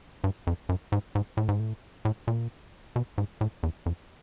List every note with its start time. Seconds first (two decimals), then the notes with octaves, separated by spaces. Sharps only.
0.24 G2
0.47 F2
0.69 F#2
0.92 G#2
1.15 G#2
1.37 A2
1.49 G#2
1.60 A2
2.05 A2
2.28 A#2
2.96 B2
3.18 G#2
3.41 A2
3.63 E2
3.86 F2